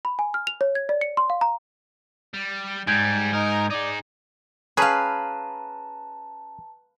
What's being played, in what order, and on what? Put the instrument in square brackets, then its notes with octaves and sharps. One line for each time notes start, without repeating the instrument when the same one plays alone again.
[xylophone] B5
G#5
F6
F7
C#5
G#6
D5
C#7
C6
F5
A#5
[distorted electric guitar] G3
[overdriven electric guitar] G#2 [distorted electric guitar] G3 [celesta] G6 G#6 D7
[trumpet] D#4 [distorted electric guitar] A#4
[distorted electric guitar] D#4 G#4 [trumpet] D5
[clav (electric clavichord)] C#4 G#4 [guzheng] B4 F5 [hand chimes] A5 A#5